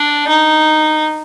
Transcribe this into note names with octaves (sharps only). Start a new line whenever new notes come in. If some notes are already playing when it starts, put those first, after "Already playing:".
Already playing: D4
D#4